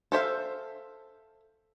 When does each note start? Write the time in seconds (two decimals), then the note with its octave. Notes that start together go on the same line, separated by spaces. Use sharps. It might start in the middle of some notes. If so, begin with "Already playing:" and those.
0.12 A4 C5 E5 F5